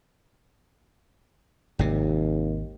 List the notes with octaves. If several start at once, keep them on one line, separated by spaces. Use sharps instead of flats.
G#1 D#2 C3